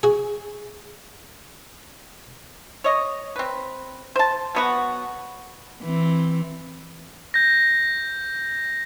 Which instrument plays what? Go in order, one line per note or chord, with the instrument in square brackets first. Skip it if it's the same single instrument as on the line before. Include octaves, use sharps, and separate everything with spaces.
[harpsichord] F#4 G#4
[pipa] C#5 D#5
C4 B4
C5 A5
F#3 B3 F#4
[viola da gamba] E3 C4
[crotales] G6 A#6